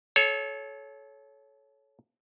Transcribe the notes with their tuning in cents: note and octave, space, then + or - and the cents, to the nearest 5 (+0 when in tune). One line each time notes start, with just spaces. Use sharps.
A4 -30 C#5 +0